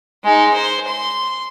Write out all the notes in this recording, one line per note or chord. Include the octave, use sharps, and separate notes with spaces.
G#3 D#4
C5
C6